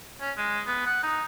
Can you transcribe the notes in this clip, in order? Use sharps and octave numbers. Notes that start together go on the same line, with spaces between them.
C#4
G#3
B3
F#5
D#4